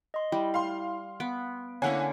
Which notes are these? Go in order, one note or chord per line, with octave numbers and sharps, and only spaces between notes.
D#5 C6
G3 E4
F5 C6
B3 D7
D3 A#3 C#4 E4 C#5 F#5 G#5